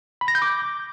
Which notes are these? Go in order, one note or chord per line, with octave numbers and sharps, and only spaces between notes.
B5
A#6
G6
D6